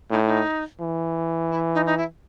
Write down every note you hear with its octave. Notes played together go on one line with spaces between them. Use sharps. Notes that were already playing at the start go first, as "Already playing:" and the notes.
A2 D#4
D#4
E3
E4
D#4
D#4
E4